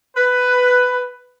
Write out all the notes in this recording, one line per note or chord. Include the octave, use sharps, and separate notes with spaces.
B4